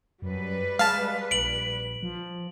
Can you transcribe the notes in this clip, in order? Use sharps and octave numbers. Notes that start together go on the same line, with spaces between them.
F#2 G3 B4
G#3 F5 A5
A#1 D7 F#7
F3